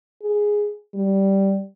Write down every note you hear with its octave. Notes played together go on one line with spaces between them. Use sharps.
G#4
G3